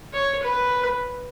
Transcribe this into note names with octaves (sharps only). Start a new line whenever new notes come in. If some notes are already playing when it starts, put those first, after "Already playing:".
C#5
B4